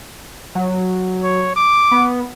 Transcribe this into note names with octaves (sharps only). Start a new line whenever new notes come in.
F#3
C#5
D6
B3